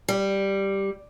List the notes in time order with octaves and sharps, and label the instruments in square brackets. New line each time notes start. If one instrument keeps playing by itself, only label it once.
[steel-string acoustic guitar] G3